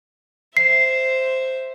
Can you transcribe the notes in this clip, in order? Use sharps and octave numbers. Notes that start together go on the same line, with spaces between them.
C5 E5 C7